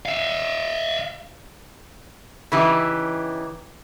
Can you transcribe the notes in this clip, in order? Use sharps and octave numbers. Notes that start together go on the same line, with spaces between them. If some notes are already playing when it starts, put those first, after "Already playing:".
E5 F5
C#3 E3 D#4 G4